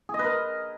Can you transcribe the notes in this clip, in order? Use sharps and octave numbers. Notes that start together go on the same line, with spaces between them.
G#4
D#5
B4
A#4